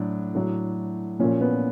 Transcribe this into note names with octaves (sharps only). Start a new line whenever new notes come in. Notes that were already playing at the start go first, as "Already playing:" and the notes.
Already playing: A2 F#3 D4
A2 F#3
A#2 F3 C#4
B3